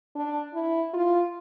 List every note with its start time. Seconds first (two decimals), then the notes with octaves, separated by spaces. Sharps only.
0.15 D4
0.54 E4
0.93 F4